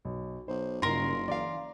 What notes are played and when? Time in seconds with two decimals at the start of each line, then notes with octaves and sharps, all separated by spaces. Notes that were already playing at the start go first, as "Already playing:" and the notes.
0.05 B1
0.48 B1 C5
0.82 F#1 G2 C#3 D#4 F4 A#4 C6
1.28 E3 D5 F5